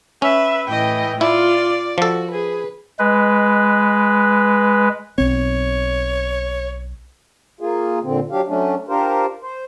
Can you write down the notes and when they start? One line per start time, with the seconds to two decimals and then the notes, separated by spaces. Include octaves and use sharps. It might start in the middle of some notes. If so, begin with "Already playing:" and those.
0.22 C#4 B4 E5
0.68 A2 E3 D#5 G5
1.21 E4 F4 D5
1.98 F3 F#4 A4
2.32 G#4 B4
2.99 G#3 B4
5.18 B1 C4 C#5
7.61 A#3 F4 G#4
8.03 A#2 D3 C4
8.31 F#3 D4 G4 F5
8.48 F#3 A3 C#4 D4
8.88 D4 F4 G4 A#4 C5
9.42 C5